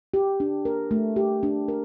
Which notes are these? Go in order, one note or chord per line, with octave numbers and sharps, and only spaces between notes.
G4
D4
A#4
A3
G4
D4
A#4